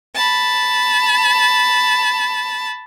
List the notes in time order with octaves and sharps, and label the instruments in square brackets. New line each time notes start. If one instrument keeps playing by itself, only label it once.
[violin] A5 B5